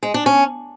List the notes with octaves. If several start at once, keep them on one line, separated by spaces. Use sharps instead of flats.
G#3
D4
C#4